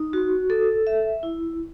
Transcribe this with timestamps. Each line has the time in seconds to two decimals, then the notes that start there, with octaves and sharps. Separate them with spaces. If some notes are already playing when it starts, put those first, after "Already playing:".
Already playing: D#4
0.13 F#4
0.50 A4
0.87 E5
1.23 E4